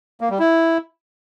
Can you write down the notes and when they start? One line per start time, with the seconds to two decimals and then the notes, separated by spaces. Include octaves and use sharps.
0.21 A#3
0.30 G3
0.39 E4